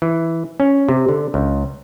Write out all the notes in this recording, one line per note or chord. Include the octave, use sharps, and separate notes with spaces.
E3
C#4
C3
D3
C#2